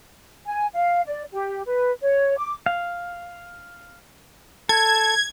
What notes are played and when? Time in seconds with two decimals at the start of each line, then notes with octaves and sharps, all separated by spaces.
0.46 G#5
0.75 F5
1.06 D5
1.33 G4
1.66 B4
2.02 C#5
2.37 D6
2.66 F5
4.69 A4 G#6